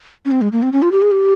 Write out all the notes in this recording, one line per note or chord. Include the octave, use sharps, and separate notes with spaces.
C#4
C4
G#3
A#3
C4
C#4
F4
G4
G#4
G4